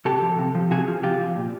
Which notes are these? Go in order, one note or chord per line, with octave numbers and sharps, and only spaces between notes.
C3 G4 A4
F3
C3
F3
C3 F#4 G#4
F3
C3 F4 G4
F3
A#2